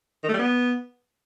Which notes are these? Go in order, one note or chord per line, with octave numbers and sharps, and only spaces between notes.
D#3
A3
G3
B3